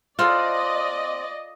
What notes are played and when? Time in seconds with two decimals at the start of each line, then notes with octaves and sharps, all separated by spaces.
0.19 C4 F4 A4 D5 D#5 F#5